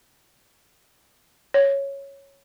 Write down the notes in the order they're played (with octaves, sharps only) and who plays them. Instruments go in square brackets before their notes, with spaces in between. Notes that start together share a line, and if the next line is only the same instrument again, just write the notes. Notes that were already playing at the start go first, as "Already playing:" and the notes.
[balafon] C#5